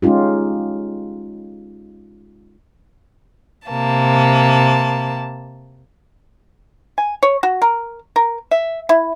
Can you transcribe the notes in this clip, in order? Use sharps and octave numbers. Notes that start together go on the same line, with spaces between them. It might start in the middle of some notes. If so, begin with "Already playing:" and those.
G#3 C#4 D#4 F4 G4
C3 A#3 A5
G#5
C#5
F#4
A#4
A#4
E5
E4